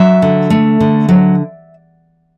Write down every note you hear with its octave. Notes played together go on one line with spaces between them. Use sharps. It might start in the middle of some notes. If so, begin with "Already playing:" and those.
Already playing: F#3 E5
D3
A3
D3
F#3